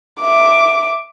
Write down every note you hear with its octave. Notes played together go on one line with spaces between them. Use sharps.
E5 D6